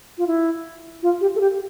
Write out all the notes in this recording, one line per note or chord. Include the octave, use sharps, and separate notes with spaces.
F4
E4
F4
G4
A4
G4